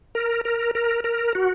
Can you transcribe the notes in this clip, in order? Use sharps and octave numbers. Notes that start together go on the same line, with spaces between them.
A#4
A#4
A#4
A#4
F#4